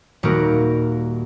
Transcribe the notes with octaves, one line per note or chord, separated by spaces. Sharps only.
D#1 G3 A#3 F#4 A#4